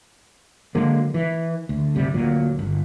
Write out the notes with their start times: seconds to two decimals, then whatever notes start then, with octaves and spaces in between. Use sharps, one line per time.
0.75 D3 F#3 G#3 A#3
1.14 E3
1.69 D2
1.95 G1 D2 C3 G3
2.14 D2 A#2 F#3
2.59 G1